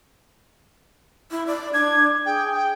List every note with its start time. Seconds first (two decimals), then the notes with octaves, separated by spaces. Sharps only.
1.31 E4
1.47 D5
1.74 D4 G#6
2.26 G#4 G5
2.54 G5